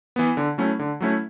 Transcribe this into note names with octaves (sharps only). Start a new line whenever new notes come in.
E3 B3
D3
F#3 A3 C#4 E4
D3
F#3 A3 C#4 E4